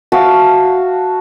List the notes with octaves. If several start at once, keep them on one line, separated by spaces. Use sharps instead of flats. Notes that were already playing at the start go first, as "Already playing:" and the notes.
F#4 E5 F5 A5